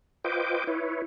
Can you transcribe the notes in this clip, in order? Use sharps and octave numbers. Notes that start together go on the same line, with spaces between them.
F4 B4 C5 D#5 G5 D6
E4 B4 C#5